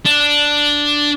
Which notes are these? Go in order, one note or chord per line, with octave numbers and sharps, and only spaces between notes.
D4